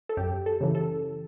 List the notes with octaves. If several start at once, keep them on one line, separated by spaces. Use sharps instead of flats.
A4
F#2 G4
A4
C#3 E3
A4